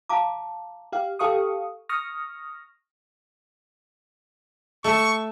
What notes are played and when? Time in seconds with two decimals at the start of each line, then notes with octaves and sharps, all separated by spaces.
0.09 F5 A5 A#5 D6
0.92 G4 F5
1.19 G4 A4 F5 C#6 D#6
1.89 C#6 D#6 F6 A#6
4.84 A3 C#6